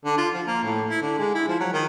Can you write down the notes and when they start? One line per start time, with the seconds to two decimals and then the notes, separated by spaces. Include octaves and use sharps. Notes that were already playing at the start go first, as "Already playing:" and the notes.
0.05 D3
0.18 F4
0.34 F3
0.47 A#3
0.64 A2
0.90 E4
1.02 D3
1.18 G#3
1.35 E4
1.48 F3
1.60 F#3
1.73 D#3